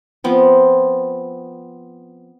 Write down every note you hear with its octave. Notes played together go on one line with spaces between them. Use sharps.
F3 B3 C4